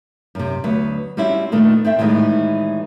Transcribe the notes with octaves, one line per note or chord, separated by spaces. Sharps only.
F#2 C3
D2 F#3 B3 B4
G3 C4 C#4 E4 F#4
A#2 D#3 A3 B3 D4
C4 A4 E5 G5
A2 D#3 E3 G3 G#3